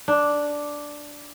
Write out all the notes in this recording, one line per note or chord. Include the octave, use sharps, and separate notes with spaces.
D4